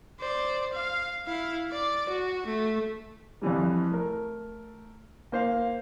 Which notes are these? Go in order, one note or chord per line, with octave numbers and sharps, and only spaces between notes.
C5 D5
F5
E4 F5
D5 D6
F#4
A3
F2 C3 E3 G3
A3 A#4
A#3 C5 F5